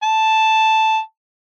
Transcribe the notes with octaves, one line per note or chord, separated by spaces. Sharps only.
A5